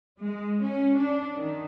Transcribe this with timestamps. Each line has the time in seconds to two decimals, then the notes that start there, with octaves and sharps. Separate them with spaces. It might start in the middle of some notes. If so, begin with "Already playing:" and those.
0.20 G#3
0.62 C#4
0.97 D4
1.36 D#3